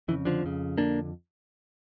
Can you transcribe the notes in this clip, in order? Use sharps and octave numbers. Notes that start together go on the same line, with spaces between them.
F2 C#3 E3
D3 F3
F2 C#3
F2 D3 A#3 D4